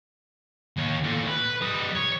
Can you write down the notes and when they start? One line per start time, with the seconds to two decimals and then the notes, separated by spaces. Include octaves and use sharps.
0.77 D#2 C#5
1.04 A#2 A3
1.27 B4
1.62 G3 D#5
1.95 C#5